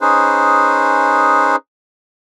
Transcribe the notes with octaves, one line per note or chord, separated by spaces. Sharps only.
C#4 D#4 G#4 B4 C5